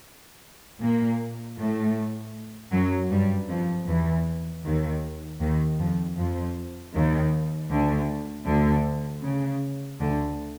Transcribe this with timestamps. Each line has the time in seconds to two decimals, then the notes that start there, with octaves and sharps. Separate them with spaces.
0.81 A#2 A#3
1.57 A2 A3
2.72 F#2 F#3
3.11 G2 G3
3.49 F2 F3
3.87 E2 E3
4.64 D#2 D#3
5.40 D#2 D#3
5.79 F2 F3
6.17 F2 F3
6.94 D#2 D#3
7.70 D2 D3
8.47 D2 D3
9.23 C#3
10.00 D2 D3